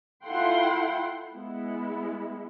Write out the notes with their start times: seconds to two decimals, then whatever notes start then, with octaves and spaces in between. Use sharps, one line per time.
0.24 E4 F4 A4 F#5 G5 C6
1.33 G#3 B3 E4